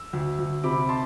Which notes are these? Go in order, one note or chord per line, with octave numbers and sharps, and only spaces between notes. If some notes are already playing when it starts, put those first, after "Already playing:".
Already playing: E6
D2
D2
C3 B5 D6
A5 C6